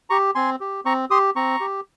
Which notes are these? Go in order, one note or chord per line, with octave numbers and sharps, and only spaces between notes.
G4 A#5 C#6
C4 G#5 C6
G4
C4 A#5 C#6
G4 C6 D#6
C4 A#5 C#6
G4